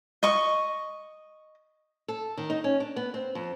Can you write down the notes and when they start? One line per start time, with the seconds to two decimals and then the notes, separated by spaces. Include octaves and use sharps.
0.23 D#5 C#6
2.08 A4
2.37 D#3
2.50 D#4
2.64 C#4
2.80 D4
2.96 B3
3.14 C4
3.35 F2